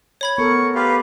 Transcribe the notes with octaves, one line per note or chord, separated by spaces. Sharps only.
C#5 B5 G#6
B3 A4 A#4 C#6
F4 G4 B4 F5